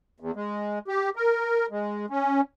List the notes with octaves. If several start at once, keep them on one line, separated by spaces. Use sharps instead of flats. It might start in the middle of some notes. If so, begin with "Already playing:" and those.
E2
G#3
G4
A#4
G#3
C#4